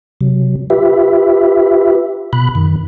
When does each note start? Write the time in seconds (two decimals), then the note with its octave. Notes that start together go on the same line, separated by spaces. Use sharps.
0.21 C3 F#3
0.70 F4 G4 B4 E5
2.33 B2 B5 F#6
2.55 F#2 D#3